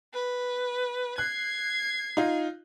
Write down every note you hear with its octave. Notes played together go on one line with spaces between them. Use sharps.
B4
F#6 G#6 C7
D#4 F4